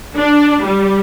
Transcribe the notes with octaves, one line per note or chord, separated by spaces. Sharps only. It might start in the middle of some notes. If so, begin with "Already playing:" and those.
D4
G3